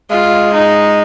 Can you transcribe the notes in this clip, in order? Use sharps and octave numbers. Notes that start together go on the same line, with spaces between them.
G#3 F4
D#4